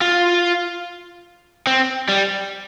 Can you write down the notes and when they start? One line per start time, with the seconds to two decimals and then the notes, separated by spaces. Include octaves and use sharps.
0.01 F4
1.67 C4
2.09 G3